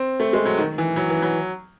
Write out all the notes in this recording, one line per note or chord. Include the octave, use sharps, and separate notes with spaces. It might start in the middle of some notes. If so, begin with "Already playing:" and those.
Already playing: C4
A3
G#3
F#3
D#3
E3
F#3
E3
F#3